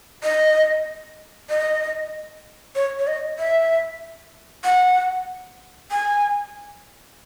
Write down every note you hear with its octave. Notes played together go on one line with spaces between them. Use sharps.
D#5
D#5
C#5
C#5
D#5
E5
F#5
G#5